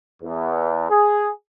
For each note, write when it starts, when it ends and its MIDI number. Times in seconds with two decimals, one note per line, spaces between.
0.23 0.88 40
0.90 1.29 68